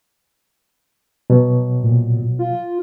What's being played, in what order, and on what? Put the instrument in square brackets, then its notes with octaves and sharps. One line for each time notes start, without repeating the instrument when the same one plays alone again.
[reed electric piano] B2 F#3
[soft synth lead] A#2
F4